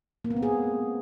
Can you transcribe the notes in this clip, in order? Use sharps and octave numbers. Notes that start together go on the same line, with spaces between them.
A#3
B3
C4
G#4